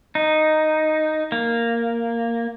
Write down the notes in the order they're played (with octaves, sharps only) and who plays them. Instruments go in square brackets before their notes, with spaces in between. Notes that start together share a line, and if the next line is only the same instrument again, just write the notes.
[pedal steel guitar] D#4
A#3